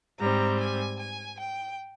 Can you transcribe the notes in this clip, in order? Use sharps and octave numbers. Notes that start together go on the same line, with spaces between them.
G#2 G3 C4 A#5
G#5
G#5
G5